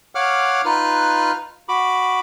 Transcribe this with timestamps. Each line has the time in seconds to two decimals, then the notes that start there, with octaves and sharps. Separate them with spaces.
0.15 C#5 F5 F#5 D6 F6
0.65 D#4 F4 B4 F6 F#6
1.69 F#4 B5 D6